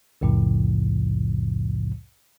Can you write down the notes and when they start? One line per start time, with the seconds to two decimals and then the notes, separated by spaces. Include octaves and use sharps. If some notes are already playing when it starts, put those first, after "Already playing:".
0.21 C2 F2 A2 C#3 F3